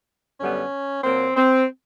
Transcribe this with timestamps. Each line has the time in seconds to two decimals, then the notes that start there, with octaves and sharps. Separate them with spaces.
0.40 F#2 D3 G3 B3 C#4
1.04 A#2 F#3 A#3 C4
1.36 C4